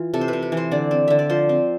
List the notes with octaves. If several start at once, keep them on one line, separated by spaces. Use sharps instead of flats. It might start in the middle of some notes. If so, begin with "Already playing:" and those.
Already playing: E3 F4
C3 A4
C5
C3 B4
B4
E3
C5
D3 D5
C4
D3 E5
D5
F3 C5
C4